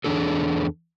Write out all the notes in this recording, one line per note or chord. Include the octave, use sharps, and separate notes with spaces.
E2 D#3 D4 G#4 A4